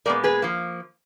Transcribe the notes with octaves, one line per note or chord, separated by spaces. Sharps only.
A#2 G#3 B3 A#4 D5
G#4 B4
F3 A#3